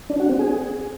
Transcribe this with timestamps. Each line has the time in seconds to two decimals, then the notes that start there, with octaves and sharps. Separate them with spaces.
0.10 D4
0.20 F#4
0.29 C4
0.39 G#4